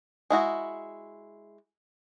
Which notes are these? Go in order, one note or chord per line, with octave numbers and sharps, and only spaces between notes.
G#3 E4 F#4 D#5